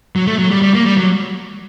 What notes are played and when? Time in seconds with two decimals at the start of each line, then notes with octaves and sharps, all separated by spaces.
0.16 F#3
0.27 A3
0.39 F#3
0.51 G3
0.62 G3
0.74 A#3
0.86 G3
0.97 F#3